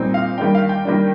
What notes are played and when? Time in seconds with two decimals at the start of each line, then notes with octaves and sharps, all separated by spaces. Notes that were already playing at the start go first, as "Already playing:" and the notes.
Already playing: A#2 G3 C4 D#4
0.14 F5
0.38 D#3 G3 A#3 D4 G5
0.55 F5
0.69 G5
0.85 D#3 G3 A#3 D4